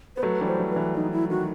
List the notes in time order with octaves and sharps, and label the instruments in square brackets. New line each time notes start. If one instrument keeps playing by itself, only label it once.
[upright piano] B3 [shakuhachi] C5
[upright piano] F#3 A3 [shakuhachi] B4
[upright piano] E3 G3
[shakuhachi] C5
[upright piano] E3
[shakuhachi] B4
[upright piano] E3
[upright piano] E3 [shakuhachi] D#4
[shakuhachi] E4
[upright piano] D#3 [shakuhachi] F#4